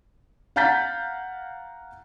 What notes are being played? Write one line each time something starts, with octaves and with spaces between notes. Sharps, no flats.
F5 F#5 A#5 G6 A6 B6